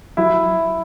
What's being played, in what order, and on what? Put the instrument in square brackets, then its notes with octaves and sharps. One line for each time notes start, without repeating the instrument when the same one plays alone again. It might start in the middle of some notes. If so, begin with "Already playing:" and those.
[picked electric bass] F#3 [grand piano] E4